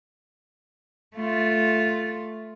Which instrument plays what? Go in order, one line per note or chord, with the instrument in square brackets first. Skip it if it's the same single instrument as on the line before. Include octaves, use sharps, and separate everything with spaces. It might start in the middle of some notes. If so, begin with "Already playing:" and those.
[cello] A3 F4